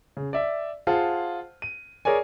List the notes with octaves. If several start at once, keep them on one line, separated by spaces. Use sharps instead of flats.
C#3
D5 E5
F4 G#4 C5 F#5 A5
D#7
G#4 A#4 C#5 D5 G#5